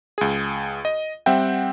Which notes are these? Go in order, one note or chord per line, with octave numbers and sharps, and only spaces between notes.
C#2 G#4
D#5
G3 C4 E5 F#5 G5